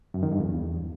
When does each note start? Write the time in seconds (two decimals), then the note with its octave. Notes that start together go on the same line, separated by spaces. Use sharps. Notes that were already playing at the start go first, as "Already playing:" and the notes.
0.14 F#2
0.23 D#3
0.31 G2
0.40 F2
0.49 E2